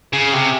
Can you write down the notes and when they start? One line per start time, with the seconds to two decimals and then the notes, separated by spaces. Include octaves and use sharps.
0.13 C#3
0.33 C3